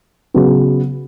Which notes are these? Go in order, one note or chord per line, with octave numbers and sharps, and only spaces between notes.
C#3 F#3 B3